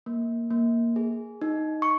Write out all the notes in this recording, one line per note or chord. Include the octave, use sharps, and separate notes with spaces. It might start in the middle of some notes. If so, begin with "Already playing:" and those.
A#3
A#3
G#4
D#4
C#6